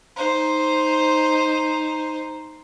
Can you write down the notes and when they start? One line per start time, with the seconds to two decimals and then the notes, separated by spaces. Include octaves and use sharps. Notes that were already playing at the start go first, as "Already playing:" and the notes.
0.16 D#4 C5